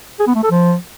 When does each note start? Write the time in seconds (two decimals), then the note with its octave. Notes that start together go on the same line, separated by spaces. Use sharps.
0.20 G#4
0.27 B3
0.35 A3
0.43 A4
0.51 F3